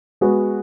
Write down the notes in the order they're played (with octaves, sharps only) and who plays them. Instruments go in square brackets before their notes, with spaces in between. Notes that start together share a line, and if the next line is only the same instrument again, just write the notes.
[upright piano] G#3 B3 F#4